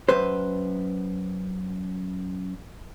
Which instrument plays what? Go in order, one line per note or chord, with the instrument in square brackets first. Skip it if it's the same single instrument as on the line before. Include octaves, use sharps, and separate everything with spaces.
[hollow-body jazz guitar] F#2 B4 C5